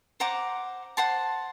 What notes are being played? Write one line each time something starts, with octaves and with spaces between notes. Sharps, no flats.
C5 F#5 A#5 D6
C5 F#5 A5 C6